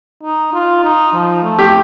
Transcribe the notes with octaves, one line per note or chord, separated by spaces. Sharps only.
D#4
F4
D#4
F3
A3
G4